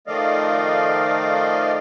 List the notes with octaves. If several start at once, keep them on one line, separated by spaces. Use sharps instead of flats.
D#3 F3 A3 D5 D#5 F5